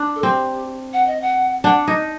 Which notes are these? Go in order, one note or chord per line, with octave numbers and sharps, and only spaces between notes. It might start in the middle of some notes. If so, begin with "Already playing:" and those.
Already playing: D4
A4
C4 G4
F#5
D#5
F#5
D4 F#5
D#4 D#5